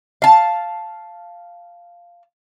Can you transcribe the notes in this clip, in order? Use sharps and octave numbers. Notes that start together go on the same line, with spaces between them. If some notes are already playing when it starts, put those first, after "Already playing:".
F5 A5